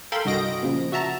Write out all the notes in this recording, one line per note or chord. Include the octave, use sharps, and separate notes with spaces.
A4 A#4 F5 G5 B5 C6
C2 G2 F#4 D#5 A#6 D7
A#2 C#3 F3
F#4 E5 A5 A#5